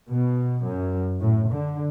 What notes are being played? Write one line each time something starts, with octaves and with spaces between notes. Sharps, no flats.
B2
F#2
A2
D3